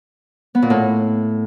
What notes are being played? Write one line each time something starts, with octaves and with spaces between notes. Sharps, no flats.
B3
A#2
A2